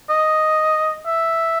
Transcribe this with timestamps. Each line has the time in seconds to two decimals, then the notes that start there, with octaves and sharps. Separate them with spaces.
0.09 D#5
1.06 E5